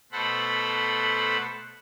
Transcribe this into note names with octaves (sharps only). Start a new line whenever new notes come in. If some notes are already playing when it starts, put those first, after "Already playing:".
B2 A3 A4 C5 F#5 B5